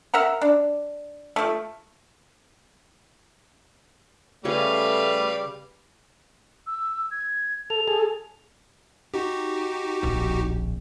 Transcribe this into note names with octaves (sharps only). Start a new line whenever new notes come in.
A#4 E5 F#5 A#5
D4
F3 A3
C#3 G3 A3 G#4 B4 C#5 F5
E6
G#6
A4 F7
G#4 A4
D#4 F#4 G4
D1 A#1